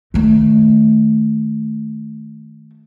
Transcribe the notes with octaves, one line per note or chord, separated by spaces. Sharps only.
D#3 A3